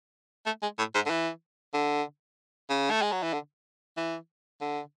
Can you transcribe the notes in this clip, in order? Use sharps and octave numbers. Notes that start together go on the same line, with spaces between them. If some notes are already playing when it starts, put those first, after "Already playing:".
A3
G#3
A2
G#2
D3
E3
D3
C#3
A3
G#3
F#3
E3
D3
E3
D3